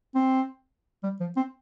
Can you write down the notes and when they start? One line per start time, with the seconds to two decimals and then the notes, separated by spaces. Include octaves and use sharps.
0.15 C4
1.03 G3
1.20 F3
1.37 C4